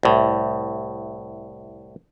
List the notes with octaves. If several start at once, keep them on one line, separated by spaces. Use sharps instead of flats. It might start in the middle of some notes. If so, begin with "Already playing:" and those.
C2 A2